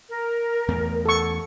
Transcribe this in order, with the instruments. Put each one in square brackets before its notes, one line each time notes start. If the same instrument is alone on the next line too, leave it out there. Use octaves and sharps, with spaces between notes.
[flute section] A#4
[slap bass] E2 A3 B3
[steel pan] A4 C#6